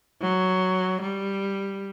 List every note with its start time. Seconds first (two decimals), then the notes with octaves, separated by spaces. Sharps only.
0.22 F#3
1.01 G3